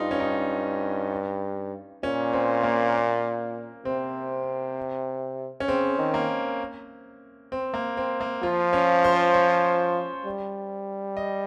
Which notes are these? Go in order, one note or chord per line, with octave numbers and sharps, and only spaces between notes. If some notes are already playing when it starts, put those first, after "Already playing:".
Already playing: G2 D#4 F4
C#4
D#4
A#2 C#4
C4
A#3
C3 C4
C#4
C#3 C4
D#3
A#3
C4
A#3
C4
A#3
F3 F4
C#4
C5
C#5
G3
D#5